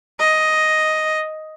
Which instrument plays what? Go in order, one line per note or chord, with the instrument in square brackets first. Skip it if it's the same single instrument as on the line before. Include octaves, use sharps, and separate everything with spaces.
[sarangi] D#5